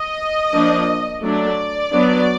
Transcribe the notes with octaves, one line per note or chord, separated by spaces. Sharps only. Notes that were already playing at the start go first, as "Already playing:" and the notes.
Already playing: D#5
F3 A#3 D4
F#3 A3 D4 D5
F#3 B3 D4